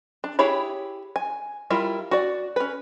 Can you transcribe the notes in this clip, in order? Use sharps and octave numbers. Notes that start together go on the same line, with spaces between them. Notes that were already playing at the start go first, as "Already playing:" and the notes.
D4
E4 G4 G#4 C#5 B5
G#5
G3 E4 F4 A#4
F#4 D5
C#4 B4